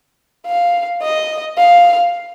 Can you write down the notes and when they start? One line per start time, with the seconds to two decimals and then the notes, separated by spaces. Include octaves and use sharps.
0.47 F5
1.02 D#5
1.58 F5